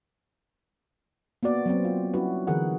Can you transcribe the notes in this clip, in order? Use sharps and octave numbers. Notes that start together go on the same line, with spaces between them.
A#3 B3 F#4 D5
F#3 B3 C4
F4
G3 C#4 E4 F#4 B4
D3 E3 G#4 A#4 F#5